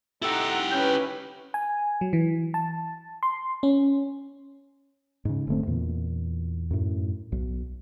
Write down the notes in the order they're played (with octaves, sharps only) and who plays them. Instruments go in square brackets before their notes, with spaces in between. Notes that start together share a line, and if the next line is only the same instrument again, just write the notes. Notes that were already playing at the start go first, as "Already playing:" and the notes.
[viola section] D#4 F#5 A#5 [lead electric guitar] E4 G4 [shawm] A4
[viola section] C#4 B4 [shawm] G5
[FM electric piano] G#5
F#3
E3
A5
C6
C#4
[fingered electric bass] G#2 C#3
F1 D3 A3 C4
E2 A#2
F#2 A2
B1